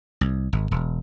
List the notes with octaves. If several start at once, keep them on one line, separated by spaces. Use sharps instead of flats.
C2
G#1
E1